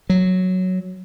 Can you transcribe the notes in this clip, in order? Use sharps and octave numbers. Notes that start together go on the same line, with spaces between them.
F#3